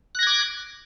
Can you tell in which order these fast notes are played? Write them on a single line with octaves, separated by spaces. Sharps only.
F#6 A#6 G#6 D6